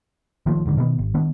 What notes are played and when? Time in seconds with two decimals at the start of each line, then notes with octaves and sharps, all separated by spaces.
0.46 A1 D#3 F3 A3
0.65 F1 G#2 D3
0.77 B2 D#3 G3 B3
0.98 G#1
1.14 D#3 B3 D4